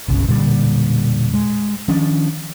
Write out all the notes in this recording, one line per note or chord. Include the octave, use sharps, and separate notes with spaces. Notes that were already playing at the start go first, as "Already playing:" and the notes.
G1 C2 C#3
E1 A#2 D3 G3
G#3
D#3 F3 C#4 D4